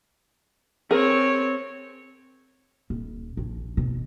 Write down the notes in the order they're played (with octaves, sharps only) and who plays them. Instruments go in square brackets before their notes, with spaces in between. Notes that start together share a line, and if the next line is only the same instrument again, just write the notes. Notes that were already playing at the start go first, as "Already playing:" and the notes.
[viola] C4 C#5 [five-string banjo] G#4 A#4
[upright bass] D#1
A#1
B2